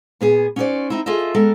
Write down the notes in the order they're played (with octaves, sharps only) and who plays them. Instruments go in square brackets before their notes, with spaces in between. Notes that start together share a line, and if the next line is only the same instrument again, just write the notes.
[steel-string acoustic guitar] A#2 B3 G#4
C#4 D#4 F#4 G#4 C5 D5
C4 D#4 E4
F4 G#4 A4 D#5 E5
G#3 B3 A4 A#4